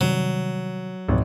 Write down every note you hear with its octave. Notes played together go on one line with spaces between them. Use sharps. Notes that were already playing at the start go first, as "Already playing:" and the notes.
C3 D#3 F#3 G3
G#1 C#2 B2 F3